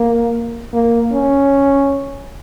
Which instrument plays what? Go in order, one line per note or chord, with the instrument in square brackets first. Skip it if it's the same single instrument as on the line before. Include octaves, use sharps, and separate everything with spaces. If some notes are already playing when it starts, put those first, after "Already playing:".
Already playing: [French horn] A#3
A#3
C#4